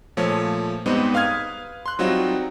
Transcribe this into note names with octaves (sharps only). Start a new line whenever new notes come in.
A#2 F3 A3 C#5
G#2 G3 B3 C4 D#4
B4 F5 D#6 F6 G#6
C6 F#6
F#3 G3 C4 D#4 F4 F#4